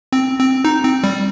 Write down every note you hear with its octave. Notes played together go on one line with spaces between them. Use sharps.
C4
C4
D#4
C4
G3